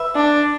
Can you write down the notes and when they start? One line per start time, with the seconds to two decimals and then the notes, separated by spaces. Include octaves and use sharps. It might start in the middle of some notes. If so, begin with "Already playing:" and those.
Already playing: B4 E5
0.16 D4